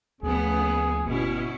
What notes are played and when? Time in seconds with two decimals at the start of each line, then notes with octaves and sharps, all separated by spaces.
0.23 D2 C#3 F3 A3 B3 G#4
1.06 G1 B2 C#4 E4